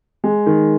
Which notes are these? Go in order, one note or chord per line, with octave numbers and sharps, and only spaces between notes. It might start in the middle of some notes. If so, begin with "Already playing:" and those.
G#3
D#3